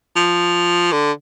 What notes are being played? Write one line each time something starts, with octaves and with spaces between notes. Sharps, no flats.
F3
D3